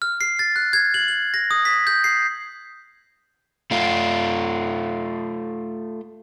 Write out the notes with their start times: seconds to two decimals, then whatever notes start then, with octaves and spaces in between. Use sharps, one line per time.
0.02 F6
0.21 C7
0.39 A6
0.56 F#6
0.73 G#6
0.94 F#7
1.08 F#7
1.34 A#6
1.51 D#6
1.65 B6
1.87 G6
2.04 C7
3.71 A3 F4